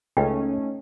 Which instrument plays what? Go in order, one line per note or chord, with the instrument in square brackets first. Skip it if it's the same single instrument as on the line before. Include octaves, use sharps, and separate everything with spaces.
[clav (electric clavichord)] C#2 [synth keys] A3 C#4 D#4 [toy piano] G5